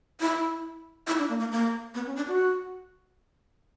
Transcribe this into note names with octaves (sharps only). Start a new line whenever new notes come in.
E4
E4
D4
A#3
A#3
A#3
B3
C#4
D4
F#4